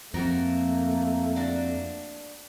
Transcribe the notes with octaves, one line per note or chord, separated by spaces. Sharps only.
F2 A3 A#3 F#4 A#4
D4 F#4